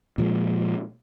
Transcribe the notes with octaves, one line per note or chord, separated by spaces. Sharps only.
A#2 F3 G#3